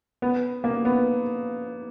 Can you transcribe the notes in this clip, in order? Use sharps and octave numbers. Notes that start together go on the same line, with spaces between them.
B3
A#3
B3